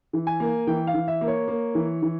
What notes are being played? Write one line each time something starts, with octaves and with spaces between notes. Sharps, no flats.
E3
G#5
A#3
E3 G5
F5
E3
E5
A#3
C#5
A#3
E3
E3